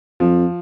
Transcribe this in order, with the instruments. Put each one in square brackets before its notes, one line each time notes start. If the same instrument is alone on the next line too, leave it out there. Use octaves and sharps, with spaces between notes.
[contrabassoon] F2 [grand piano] F3